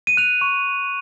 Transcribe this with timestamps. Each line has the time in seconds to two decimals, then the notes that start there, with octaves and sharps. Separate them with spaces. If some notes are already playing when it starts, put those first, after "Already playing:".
0.07 D#7
0.17 F#6 F7
0.41 C#6